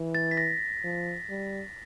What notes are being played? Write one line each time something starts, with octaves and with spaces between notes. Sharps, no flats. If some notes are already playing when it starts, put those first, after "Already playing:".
Already playing: E3
A6
B6
A#6
F3
G3